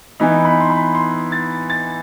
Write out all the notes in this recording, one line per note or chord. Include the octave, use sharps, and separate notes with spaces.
E3 B3 D#4
B5
C6
B5
C6
A6
A6